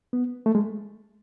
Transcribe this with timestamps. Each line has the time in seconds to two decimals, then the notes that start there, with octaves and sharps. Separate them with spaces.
0.13 B3
0.46 A3
0.55 G#3